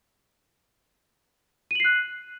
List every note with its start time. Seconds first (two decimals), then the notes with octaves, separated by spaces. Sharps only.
1.71 D#7
1.75 F#7
1.80 C7
1.84 F#6